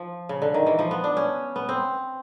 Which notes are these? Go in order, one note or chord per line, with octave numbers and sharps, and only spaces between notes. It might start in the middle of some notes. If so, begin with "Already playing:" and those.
Already playing: F3
C#3
D3
D#3
E3
F3
B3
D4
C#4
B3
C4